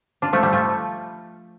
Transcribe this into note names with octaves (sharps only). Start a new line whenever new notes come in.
D4 F4
F3 A3
G3
F3 A3